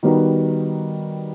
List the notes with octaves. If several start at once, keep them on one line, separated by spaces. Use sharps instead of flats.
D#3 G3 B3 D#4 F#4